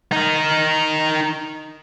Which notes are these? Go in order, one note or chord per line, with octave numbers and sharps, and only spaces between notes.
D#4 A#4